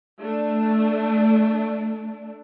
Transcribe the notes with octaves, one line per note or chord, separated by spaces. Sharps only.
A3 D4